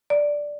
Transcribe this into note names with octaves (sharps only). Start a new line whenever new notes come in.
D5